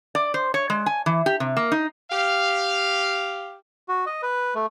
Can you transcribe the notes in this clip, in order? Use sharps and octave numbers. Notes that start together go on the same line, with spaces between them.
D5
C5
C#5
G#3
G#5
E3
G4
C3
A#3
D#4
G4 F5
F#4
D#5
B4
A3